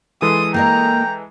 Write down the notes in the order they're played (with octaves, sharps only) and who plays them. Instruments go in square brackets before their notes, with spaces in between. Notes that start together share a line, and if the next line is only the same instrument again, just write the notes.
[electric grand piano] E3 G#3 A4 [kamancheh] C6 D#6
[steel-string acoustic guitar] A#3 A#4 D#5 [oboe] G5 [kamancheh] A#5